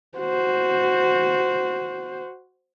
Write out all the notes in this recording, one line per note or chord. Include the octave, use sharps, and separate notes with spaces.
F#4 C5